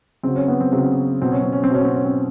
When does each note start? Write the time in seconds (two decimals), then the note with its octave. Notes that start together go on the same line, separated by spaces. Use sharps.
0.23 C#3 F#3 C4
0.36 C#4
0.48 B3
0.60 C4
0.72 C#3 F#3 C4
1.22 B2 F#3 C4
1.32 C#4
1.42 C4
1.52 C#4
1.64 C4
1.70 B2 F#3 C#4
1.85 C4
1.95 C#4
2.05 C4